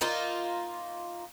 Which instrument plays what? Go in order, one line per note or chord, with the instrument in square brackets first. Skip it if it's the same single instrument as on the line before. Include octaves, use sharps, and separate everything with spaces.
[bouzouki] A#3 D#4 F4